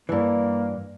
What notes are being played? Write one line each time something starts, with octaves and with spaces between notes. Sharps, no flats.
G2 E3 A#3